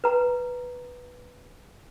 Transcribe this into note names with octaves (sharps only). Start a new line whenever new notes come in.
B4 A#5